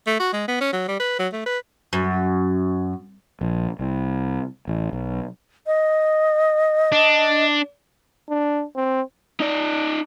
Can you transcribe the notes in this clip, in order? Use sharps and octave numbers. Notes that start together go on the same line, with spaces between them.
A3
F#4
G#3
B3
C#4
F#3
G3
B4
F#3
A3
B4
F#2
A#1
C2
A1
B1
D#5
D4
D4
C4
D#4 D5